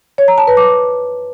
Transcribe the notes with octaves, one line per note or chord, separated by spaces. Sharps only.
C#5
A#5
A5
B4
D6